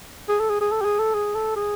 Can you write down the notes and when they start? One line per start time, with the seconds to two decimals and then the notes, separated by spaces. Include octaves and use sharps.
0.28 G#4
0.39 A4
0.49 G#4
0.61 G#4
0.71 A4
0.81 G4
0.85 G#4
0.99 A4
1.14 G#4
1.35 A4
1.56 G#4